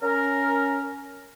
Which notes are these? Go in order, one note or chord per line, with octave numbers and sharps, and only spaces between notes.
C#4 A#4